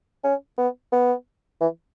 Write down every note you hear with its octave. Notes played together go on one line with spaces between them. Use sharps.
C#4
B3
B3
E3